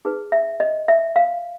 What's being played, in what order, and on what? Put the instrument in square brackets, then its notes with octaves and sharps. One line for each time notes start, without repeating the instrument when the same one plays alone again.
[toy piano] D#4 G#4 B4
E5
D#5
E5
F5